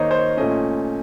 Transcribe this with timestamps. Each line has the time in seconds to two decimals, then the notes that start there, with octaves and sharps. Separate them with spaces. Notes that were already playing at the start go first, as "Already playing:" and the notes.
Already playing: D#3 A#3 D#4 C5 C#5 D#5
0.11 C5
0.19 C#5
0.37 A#2 A3 C#4 D#5